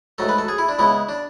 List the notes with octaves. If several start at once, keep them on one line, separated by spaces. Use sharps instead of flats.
G#2 F#3 A3 A4
B4
A4
G#4
E4
D4
C#3 G#3 B3 E4
D4